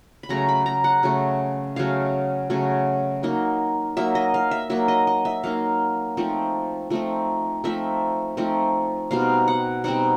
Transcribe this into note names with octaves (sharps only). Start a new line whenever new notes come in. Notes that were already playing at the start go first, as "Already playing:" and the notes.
B5
C#3 F#3 A3 A#5
B5
A#5
F#5
C#3 F#3 A3
C#3 F#3 A3 F5
C#3 F#3 A3
F#3 A#3 D#4
F#3 A#3 D#4 E5
D#5
F5
E5
F#3 A#3 D#4 E5
D#5
D#5
E5
F#3 A#3 D#4 F5
F3 A3 C4 D#4
F3 A3 C4 D#4
F3 A3 C4 D#4 E5
F3 A3 C4 D#4
B2 G3 C4 D#4 F5
F#5
B2 G3 C4 D#4 F#5